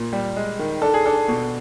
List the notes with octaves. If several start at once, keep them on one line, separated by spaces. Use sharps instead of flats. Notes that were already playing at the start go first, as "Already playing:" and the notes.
Already playing: A#2
G3
G#3
D#3
D4 A4
G#4
D4 A4
B2